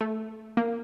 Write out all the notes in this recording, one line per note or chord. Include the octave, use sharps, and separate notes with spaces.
A3
A#3